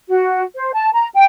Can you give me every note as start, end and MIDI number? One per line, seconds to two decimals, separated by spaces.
0.09 0.43 66
0.55 0.71 72
0.74 0.89 81
0.94 1.08 82
1.14 1.25 79